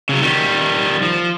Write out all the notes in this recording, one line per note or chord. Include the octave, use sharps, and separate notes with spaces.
C#3 F#3
D#3 G3
F3